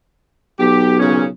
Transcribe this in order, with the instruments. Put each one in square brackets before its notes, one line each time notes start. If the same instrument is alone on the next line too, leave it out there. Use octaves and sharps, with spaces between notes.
[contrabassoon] B1 [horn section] G4
[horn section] A#2 C#3 C#4